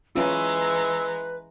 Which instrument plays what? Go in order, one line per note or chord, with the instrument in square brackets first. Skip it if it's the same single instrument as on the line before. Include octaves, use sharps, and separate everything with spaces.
[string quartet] E3 G#3 A#5 [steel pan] C#4 F4 [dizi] B4 [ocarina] E6